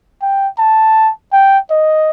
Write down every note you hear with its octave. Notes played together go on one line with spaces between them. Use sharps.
G5
A5
G5
D#5